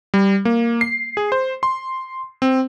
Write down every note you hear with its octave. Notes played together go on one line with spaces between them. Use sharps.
G3
A#3
C7
G#4
C5
C6
C4